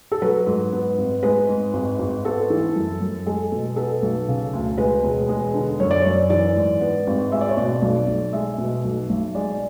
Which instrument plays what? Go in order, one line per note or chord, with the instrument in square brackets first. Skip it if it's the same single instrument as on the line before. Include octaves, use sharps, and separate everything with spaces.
[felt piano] A4
F#3 B4
G#2
B3
G#1
G#3 B4
G#2
G#1
G#1
B3 A4
E3
F#2
F#2
G#3 A4
B2
B3 A4
B1
C#3
D2
G#3 B4
E1
G#3
D3
F#2 C#5
D5
C#5
F#2
E3 D5
G#2
B3
G#1
G#3 E5
D5
C#5
B2 D5
B1
B1
G#3 E5
B2
B1
B1
G#3 D5